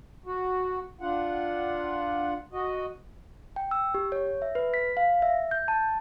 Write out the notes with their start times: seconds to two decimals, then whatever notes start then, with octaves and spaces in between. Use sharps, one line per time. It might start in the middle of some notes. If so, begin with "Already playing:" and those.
0.26 F#4
1.01 D4 F4 F#5
2.53 F#4 D#5
3.56 G5
3.71 E6
3.94 G4
4.12 C#5
4.42 E5
4.55 B4
4.74 B6
4.97 F5
5.22 E5
5.51 G6
5.68 A5